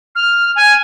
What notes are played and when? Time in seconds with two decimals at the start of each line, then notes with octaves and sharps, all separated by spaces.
0.15 F6
0.56 G#5